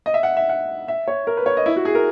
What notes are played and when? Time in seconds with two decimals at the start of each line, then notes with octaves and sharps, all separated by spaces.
0.06 D#5
0.14 E5
0.23 F#5
0.37 E5
0.49 F#5
0.88 E5
1.08 C#5
1.27 A#4
1.37 B4
1.46 C#5
1.57 D#5
1.66 E4
1.76 F#4
1.85 G#4
1.95 A#4